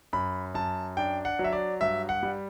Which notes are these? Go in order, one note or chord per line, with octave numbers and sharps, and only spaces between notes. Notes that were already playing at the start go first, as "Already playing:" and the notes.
F#2 B5
F#2 A5
D4 G5
F#5
F#3
E5
D5
G2 E5
F#5
G3